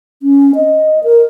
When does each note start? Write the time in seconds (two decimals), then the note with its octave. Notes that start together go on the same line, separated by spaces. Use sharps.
0.23 C#4
0.55 D#5
1.04 A#4